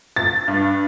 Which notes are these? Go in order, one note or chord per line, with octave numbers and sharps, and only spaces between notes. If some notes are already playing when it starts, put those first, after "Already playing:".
A6
G2